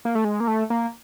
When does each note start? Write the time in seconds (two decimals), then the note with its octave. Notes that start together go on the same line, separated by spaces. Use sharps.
0.05 A#3
0.15 A3
0.25 G#3
0.40 A#3
0.47 A3
0.70 A#3